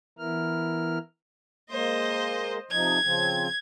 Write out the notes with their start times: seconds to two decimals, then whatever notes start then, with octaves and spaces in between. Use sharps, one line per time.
0.19 E3 B3 E4 A#4 F6
1.71 G#3 A#3 C5 D#5
2.71 C3 F3 D#4 G#6
3.04 C#3 F3 C4